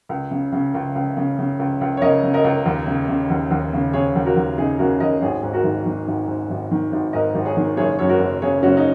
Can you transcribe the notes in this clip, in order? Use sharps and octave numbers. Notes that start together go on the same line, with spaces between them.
C#2
C#3
C#3
C#2
C#2
C#3
C#3
C#2
C#2
C#5
C#3 A#4 D#5
C#3
A#4 D#5
C#2
D#2
C#3
C#3
D#2
D#2
C#3
C#3 G#4 C#5
D#2
F#4 A#4
D#2
C#3 D#4 G#4
C#3 F#4 A#4
D#2 A#4 D#5
G#1 G#4 C#5
G#2
F#4 A#4
G#1
D#3
G#1
G#2
G#1
D#3
G#1
G#2 A#4 D#5
G#1
G#4 C#5
D#3
F#1 G#4 C#5
F#2 C#5
F#4 A#4
F#1
C#3 G#4 C#5
F#1 C#4 F#4
D#4